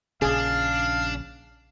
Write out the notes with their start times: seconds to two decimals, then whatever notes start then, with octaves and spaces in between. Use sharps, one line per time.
0.22 A#1 C#3 D4 G#4 F5